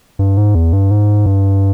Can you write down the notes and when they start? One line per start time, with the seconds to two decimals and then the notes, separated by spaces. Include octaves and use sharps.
0.19 G2
0.37 G#2
0.55 E2
0.73 G2
0.91 G#2
1.26 G2